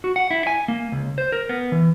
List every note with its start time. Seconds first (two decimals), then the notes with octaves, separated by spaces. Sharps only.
0.04 F#4
0.16 F#5
0.31 E4
0.47 G#5
0.68 A#3
0.92 C#2
1.18 C5
1.32 A#4
1.49 B3
1.72 E3